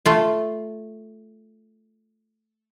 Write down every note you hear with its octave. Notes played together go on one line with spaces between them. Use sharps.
A3 F4